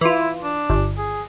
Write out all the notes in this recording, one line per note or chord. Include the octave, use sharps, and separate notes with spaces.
E3 E4 F4
D4
G1
G#4